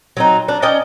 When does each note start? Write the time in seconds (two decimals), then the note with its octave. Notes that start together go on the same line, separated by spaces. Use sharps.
0.17 F#3 C4 D#4
0.48 D4
0.62 C#4 D5 D#5 G5